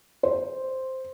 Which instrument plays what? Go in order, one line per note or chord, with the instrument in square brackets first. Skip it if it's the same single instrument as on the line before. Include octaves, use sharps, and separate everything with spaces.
[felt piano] C5